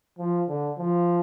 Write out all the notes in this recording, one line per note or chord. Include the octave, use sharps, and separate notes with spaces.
F3
D3
F3